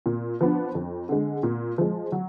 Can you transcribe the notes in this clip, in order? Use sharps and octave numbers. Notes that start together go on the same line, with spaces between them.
A#2
F3 B3 D4
F2
D3 G#3
A#2
F3 G#3
F#3